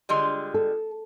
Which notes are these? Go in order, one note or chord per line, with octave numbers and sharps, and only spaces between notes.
D3 G3 G#3 F4 C6
A4